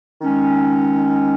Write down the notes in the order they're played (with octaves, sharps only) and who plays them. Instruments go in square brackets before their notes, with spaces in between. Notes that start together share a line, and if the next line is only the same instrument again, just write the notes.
[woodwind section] D#3 G#3 C#4